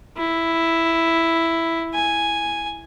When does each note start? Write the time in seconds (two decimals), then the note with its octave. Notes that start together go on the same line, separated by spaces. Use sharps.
0.17 E4
1.94 G#5